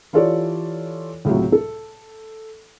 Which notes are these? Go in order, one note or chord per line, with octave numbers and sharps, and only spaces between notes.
E3 F4 G4 A4 C#5 D5
C#2 A2 C3 F#3
A4